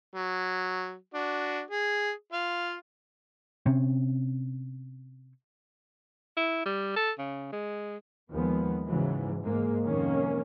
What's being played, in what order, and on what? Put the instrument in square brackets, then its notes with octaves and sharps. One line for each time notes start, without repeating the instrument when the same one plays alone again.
[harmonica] F#3
D4 F#4
G#4
F4 F5
[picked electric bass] C3 C4 C#4
[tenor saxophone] E4
G3
A4
C#3
G#3
[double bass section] D#2 F3 G#3 B3
G#2 C#3 E3 F#3
G#2 G#3 A#3
F2 C3 D#3 A#3 C#4